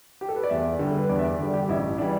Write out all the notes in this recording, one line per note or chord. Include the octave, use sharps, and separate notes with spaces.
G4
A4
B4
D5
E2 E5
D3 G3
B4
E2 D5
E5
D5
D3 G3
G4
A1 E4
D4
E3 G3